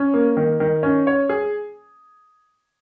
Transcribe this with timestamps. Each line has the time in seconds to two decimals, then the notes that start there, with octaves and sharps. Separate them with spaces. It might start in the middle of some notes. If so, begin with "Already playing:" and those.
Already playing: C#4
0.14 A#3
0.37 D#3
0.60 D#3
0.83 C#4
1.07 C#5
1.29 G#4